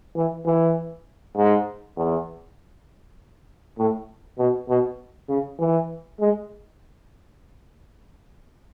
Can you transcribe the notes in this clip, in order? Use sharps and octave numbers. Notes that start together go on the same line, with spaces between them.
E3
E3
G#2
E2
A2
B2
B2
C#3
E3
G#3